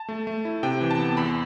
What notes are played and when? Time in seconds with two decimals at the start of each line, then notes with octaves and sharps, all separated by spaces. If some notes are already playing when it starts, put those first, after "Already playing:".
Already playing: A5
0.09 A3
0.27 A3
0.45 E4
0.63 C3 G5
0.81 E3
0.91 A5
0.99 B3
1.17 E2 B5